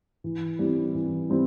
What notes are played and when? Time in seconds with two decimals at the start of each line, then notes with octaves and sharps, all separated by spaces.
0.24 E3
0.59 G3 C4 E4
0.95 E3
1.30 G3 C4 E4